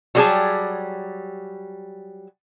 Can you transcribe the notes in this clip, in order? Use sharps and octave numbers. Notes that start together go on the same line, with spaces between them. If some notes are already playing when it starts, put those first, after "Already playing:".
F#3 G3 A3 G4 G#4 A5